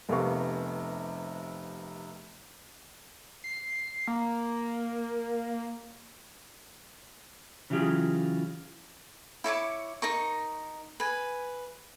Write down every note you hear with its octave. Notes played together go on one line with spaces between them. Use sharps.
F1 C3 B3 A#4 F5 C#6
C7
A#3
C#3 E3 F#3 F4 G4 G#4
E4 C#5 C#6 D6
D#4 A#4 C#6
B4 G#5